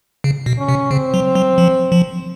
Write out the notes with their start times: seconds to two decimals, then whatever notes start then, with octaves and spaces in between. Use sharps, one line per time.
0.24 C#3
0.46 B2
0.58 C#4
0.68 C3
0.91 C#3 C4
1.14 F#3
1.35 F#3
1.58 F3
1.92 F3